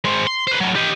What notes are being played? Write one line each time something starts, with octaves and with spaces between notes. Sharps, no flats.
G#3 C4
C6
B4 C5
A2 F#3
G4 D#5